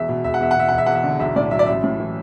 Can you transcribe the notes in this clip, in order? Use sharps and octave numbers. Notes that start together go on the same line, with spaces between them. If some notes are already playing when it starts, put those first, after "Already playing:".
Already playing: E1 E2 E5
B2
E1 E5
F#5
E2 E5
F#5
B2 E5
E1 F#5
E5
E2 F#5
E5
D3
B1 E5
A2 D5
F#3 E5
D5
A1 E5
A2
E3